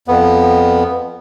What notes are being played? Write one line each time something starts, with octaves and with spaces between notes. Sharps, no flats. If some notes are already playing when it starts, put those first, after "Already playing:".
F2 B3